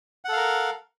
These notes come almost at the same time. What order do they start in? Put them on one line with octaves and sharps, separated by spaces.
F#5 A4 F5 A#4